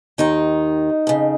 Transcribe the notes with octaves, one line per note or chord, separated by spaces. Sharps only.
D#2 D#3 D#4
F2 C#3